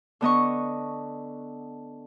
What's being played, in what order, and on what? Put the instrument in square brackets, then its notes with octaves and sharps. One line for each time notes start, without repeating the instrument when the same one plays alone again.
[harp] D3 B3 D#5 C#6